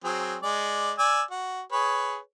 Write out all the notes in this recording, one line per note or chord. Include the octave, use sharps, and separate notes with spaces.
F#3 C4 G#4
G#3 D5
D5 G#5 E6
F#4
G#4 B4 C#5